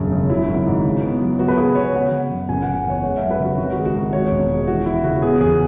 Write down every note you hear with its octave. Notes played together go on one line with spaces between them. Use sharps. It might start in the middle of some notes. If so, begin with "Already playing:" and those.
Already playing: E1 F#2 C#3
C#3
F#3 E4
G#1
G#2
C#3
B3
F#3
B3 F#4
B4
C#3 G#4
B3 C#5
C#3 F#5
C#3
F#2
F#1 G#5
F#1 F#5
E2 C#5
G#3 F#5
F#2 E5
B4
C#3 F#4
G#1 F#4
F#4
G#3
F#4
G#1
G#3 C#5
E1
G#3
E3 F#4
E3 E4
C#3 F#4
B3 G#4
E2 G#4